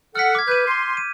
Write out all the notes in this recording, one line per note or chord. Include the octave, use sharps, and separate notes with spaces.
A4 F#5 F6 B6
D6 G#6
B4 G6 D#7
C6
D#7